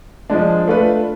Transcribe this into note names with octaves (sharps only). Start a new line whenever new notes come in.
F3 G#3 D4
A3 D4 F4 B4